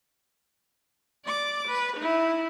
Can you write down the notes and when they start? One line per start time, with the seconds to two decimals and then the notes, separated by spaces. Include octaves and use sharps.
1.26 D5 D6
1.67 B4
1.97 D#4 E4